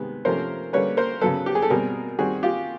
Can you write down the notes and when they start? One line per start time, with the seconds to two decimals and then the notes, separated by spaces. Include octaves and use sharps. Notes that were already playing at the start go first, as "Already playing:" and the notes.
Already playing: C3 D#3 G#3 B3
0.25 C3 F3 A3 C#4 A#4 C5
0.73 D3 G3 A#3 C#4 B4 C#5
0.97 A#4 C5
1.21 C#3 F#3 B3 A4 B4
1.46 G4
1.55 G#4
1.62 A4
1.70 B2 G3 C4 G#4 A#4
2.19 D#3 G3 C4 F#4 G#4
2.43 F4 G4